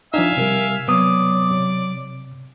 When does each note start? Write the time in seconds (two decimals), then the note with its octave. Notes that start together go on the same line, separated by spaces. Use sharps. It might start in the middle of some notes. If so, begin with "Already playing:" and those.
0.14 F3 D4 D#4 E5 F5 G#5
0.37 C3 G3 A#4
0.87 C3 F#3 B3 D5 D#6
1.51 C3